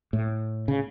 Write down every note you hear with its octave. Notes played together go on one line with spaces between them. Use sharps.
A2
C#3